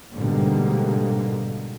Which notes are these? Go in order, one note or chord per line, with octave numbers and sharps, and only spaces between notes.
G#1 G#2 B2 D3 G3 A#3